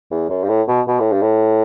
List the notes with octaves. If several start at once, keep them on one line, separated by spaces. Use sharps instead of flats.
E2
F#2
G2
A2
B2
B2
A2
G2
A2